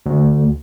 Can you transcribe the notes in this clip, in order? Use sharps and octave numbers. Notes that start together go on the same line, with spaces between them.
D2